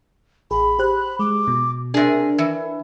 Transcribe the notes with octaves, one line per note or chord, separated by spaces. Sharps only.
A1 G#4 B5
G4 C5 F#6
G#3 D6
B2
C3 D4 G#4 A#4
E3